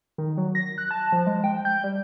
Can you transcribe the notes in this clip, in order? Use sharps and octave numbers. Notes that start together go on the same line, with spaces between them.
D#3
F#3
A#6
F#6
A5
F3
G#3
G5
G6
G3